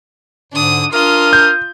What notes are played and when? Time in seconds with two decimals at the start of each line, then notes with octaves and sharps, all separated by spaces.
0.53 G#2 D3 D4 D#6
0.93 D4 F4 A#4 D#6 F6
1.33 G6